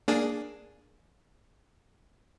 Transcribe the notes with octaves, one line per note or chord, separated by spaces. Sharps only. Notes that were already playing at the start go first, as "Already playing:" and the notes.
A#3 D4 G#4